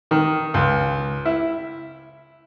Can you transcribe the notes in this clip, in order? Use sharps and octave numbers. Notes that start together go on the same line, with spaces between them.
D#3
C#2
E4